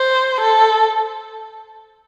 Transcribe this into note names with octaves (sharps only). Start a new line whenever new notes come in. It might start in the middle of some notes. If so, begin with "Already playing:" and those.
Already playing: C5
A4